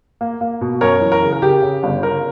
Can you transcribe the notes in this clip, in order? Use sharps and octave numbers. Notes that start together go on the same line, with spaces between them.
A#3
A#3
B2
F#2 A#4 C#5
E3
A#4
C#3
A#4
C#3 G4
C#3
G1
C#3 A#4